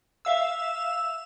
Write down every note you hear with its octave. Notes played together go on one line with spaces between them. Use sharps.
E5 F5 E6